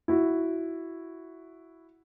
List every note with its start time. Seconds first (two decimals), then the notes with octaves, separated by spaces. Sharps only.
0.08 E4 F#4